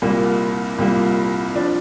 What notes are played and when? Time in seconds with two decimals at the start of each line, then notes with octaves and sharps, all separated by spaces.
0.02 C2 A#2 G3 A#3
0.78 C2 A#2 G3 A#3
1.55 F3 D4